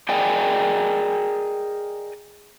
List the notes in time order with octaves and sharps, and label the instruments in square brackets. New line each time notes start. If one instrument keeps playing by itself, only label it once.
[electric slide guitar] G#4 A#4 D5 D#5 G5 G#5